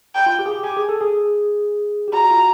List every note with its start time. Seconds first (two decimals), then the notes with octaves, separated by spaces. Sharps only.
0.15 G5
0.26 F4
0.39 G4
0.46 G#4
0.51 G4
0.64 G4 G#5
0.77 G#4
0.89 A4
1.01 G#4
2.08 G4
2.13 F#4 A#5
2.31 F4
2.38 F#4